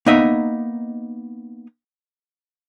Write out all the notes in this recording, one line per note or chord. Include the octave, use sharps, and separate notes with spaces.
A#3 B3 D#4 D#5 E5